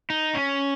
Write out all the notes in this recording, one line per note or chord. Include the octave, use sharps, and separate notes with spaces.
D#4
C#4